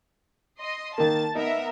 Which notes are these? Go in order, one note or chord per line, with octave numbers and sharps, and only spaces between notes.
D#5 C6
D#3 A#3 A5 A6
B3 D#4 A#4 E5